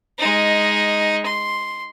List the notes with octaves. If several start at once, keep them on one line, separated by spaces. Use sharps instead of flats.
G#3 D#4
C6